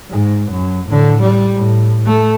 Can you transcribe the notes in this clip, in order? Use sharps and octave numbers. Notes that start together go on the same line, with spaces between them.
G#2
F#2
A2 D3
G3
A2
A3